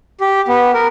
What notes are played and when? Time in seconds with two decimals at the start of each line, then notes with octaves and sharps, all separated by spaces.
0.20 G4
0.48 B3
0.74 A#4